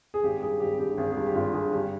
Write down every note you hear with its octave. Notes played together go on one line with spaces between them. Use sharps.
G#4
G#1 G4
G2 G#4
G#1 G4
D3 G4
G#1 G#4
G#4
G2 G4
G4
G#1 F4
D3 G#4
G2 G4